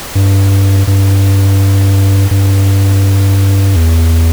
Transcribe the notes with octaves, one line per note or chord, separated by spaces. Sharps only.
G2
G2
G2
E2